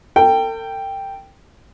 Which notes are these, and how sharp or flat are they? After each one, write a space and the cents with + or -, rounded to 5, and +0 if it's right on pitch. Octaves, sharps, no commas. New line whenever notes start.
A4 +45 G5 +0